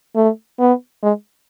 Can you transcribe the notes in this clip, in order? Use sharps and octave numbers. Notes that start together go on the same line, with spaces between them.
A3
B3
G#3